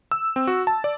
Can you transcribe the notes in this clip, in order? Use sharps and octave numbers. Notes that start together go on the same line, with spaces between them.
E6
C4
F#4
A5
D5